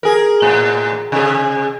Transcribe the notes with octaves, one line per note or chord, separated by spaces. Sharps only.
G#4 A#4
A2
C3 G#4